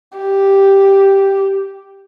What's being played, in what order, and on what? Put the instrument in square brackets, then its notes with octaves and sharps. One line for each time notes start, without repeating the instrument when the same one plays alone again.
[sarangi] G4